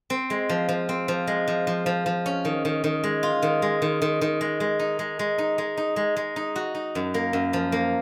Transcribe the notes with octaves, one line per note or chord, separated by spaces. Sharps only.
C4
G#3
F3
F3
C4
F3
G#3
F3
F3
F3
F3
C#4
D#3
D#3
D#3
G#3
F4
D#3
G#3
D#3
D#3
D#3
G#3
G#3
D#4
G#3
G#3
D#4
G#3
D#4
G#3
G#3
D#4
F#4
D#4
F#2
A#3
F#2
F3
A#3